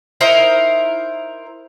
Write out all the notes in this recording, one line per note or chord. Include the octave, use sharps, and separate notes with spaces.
D#4 E4 A#4 C5